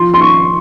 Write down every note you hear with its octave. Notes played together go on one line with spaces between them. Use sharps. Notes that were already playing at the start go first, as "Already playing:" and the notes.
Already playing: F3 C6
C6
C#6